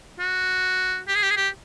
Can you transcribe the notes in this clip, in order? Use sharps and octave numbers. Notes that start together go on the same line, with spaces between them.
F#4
G4
G#4
G4
G#4
G4